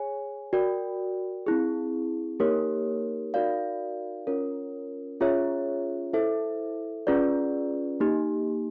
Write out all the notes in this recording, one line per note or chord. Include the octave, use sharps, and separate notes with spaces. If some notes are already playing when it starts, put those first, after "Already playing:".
Already playing: G#4 C#5 G#5
F#4 A#4 D5 G5
C4 E4 G#4
A#3 D#4 G4 A#4 C#5
D#4 F#4 A#4 D5 F5
C#4 F4 A#4 C#5
C#4 F4 G#4 C#5 E5
E4 A4 C5 E5
C#4 F4 G#4 B4 D5
A#3 D#4 G4